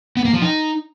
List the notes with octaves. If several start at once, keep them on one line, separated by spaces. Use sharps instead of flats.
B3
A#3
F3
D#4